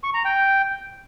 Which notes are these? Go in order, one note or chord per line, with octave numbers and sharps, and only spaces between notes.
C#6
A#5
G5